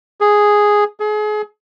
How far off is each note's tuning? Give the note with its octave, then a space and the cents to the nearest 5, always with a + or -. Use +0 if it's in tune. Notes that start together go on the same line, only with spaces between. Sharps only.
G#4 +0
G#4 +35